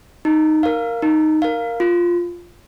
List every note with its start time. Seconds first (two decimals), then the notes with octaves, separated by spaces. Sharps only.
0.25 D#4
0.63 A#4 F5
1.02 D#4
1.42 A#4 F5
1.80 F4